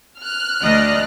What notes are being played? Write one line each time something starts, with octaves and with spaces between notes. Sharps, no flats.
F6 F#6
D2 D5 D#5